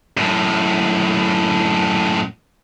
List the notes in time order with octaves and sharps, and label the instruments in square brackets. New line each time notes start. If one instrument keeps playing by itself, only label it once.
[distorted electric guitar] F#2 A2